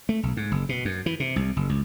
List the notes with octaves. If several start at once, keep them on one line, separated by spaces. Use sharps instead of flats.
A3
B1
G#2
F#1
B2
F#2
E3
C3
C2
F#1
C#2